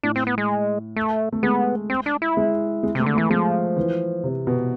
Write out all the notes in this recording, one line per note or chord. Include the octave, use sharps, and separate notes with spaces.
A2 D4
C4
B3
G#3
A3
A3
G#3 B3
C4
D4
E4
G#3
G#3
C3 A3
D3
A3
E3
F3 G#3
E3
C3
B2